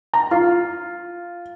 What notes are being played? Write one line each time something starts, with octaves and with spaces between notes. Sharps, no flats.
A#5
F4